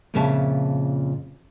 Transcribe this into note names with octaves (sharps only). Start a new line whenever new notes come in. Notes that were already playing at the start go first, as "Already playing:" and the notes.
F2 A#2 C#3 G#4 E5 A5